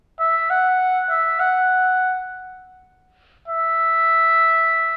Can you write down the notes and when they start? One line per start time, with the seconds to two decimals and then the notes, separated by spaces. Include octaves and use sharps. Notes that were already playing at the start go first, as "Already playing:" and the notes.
0.20 E5
0.50 F#5
1.09 E5
1.39 F#5
3.48 E5